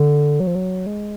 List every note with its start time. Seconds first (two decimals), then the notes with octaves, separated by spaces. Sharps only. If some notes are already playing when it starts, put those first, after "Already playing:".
Already playing: D3
0.40 F#3
0.47 F3
0.55 F#3
0.86 G#3